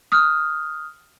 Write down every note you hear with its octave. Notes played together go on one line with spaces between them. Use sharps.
D#6 F6 F#6